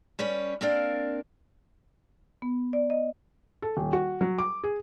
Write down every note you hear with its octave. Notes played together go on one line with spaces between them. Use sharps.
G3 C#4 B4 C#5
A#3 C4 D4 A#4 D5 F5
B3
D5
D#5
A4
D#1
F#4
F#3
D6
G#4